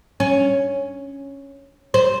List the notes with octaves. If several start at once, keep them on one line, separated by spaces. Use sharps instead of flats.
C#4
C5